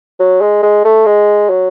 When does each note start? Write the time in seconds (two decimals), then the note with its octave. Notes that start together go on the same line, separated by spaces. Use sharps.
0.20 F#3
0.41 G#3
0.63 G#3
0.85 A3
1.06 G#3
1.50 F#3